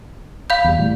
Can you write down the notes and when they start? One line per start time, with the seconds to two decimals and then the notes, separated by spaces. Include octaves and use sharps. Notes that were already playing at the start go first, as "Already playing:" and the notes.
0.50 F5 B5 G6
0.64 E2 G3
0.79 A2 G3